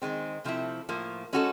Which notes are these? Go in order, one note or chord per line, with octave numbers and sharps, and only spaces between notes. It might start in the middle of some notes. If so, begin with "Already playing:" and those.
D#3 G#3 C4
C3 F3 A3 C4 E4
A2 F3 A#3
G#3 C#4 F#4 A4